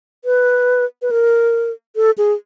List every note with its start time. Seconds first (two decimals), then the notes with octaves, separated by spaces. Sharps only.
0.25 B4
1.02 B4
1.11 A#4
1.96 A4
2.18 G#4